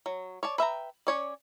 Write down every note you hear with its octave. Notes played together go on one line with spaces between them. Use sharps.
F#3
C#5 D5 A5
B4 E5 G5 A#5
C#4 C#5 D5